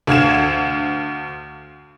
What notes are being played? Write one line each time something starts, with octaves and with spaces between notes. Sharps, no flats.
D2 F5 G#6 E7